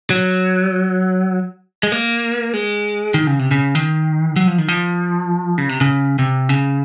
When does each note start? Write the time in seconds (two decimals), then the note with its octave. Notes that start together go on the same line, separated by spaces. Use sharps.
0.10 F#3
1.83 G#3
1.92 A#3
2.54 G#3
3.14 D#3
3.27 C#3
3.39 C3
3.51 C#3
3.75 D#3
4.36 F#3
4.48 F3
4.58 D#3
4.68 F3
5.58 C#3
5.69 C3
5.81 C#3
6.19 C3
6.49 C#3